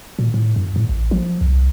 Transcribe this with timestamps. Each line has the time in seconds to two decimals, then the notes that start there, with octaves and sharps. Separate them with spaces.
0.19 A#2
0.34 A2
0.56 F#2
0.76 A2
0.89 A1
1.11 F3
1.41 C2